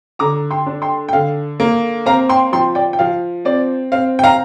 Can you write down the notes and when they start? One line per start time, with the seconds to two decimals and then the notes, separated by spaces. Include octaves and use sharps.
0.19 D3 A#5 D6
0.51 G5 C6
0.66 D4
0.82 G5 C6
1.09 G5
1.13 D3 F5
1.60 A#3
2.06 C4 F5 A#5
2.29 G5 C6
2.52 F3 G5 C6
2.75 D5 G5
2.93 G5
2.99 F3 F5
3.45 C4 D5
3.92 C4 F5
4.19 G5
4.24 F5 A#5